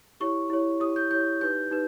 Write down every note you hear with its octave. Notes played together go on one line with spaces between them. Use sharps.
E4 G4 C#5 C#6
E4 G4 C#5
E4 G4 C#5 D#6
G6
E4 G4 C#5 G6
D#4 G4 B4 G6
D#4 G4 B4